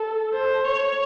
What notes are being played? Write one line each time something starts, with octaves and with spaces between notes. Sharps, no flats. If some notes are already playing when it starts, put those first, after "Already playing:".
Already playing: A4
C5
C#5